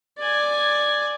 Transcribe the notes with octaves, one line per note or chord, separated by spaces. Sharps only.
D5 G#5